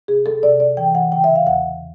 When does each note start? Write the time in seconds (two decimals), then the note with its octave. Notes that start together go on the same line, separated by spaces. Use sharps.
0.08 C3 G#4
0.26 A4
0.43 C3 D5
0.60 D5
0.77 E3 G5
0.95 F#5
1.12 C#3 G5
1.24 E5
1.36 F5
1.46 E2 F#5